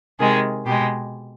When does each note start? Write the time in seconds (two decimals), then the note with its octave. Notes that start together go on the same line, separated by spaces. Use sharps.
0.19 C3 D#3 G#3 G#4
0.66 B2 G#3 G4